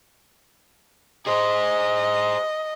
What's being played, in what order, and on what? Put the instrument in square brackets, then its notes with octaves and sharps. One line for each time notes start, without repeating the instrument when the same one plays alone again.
[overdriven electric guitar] G#4 C5 [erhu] D#5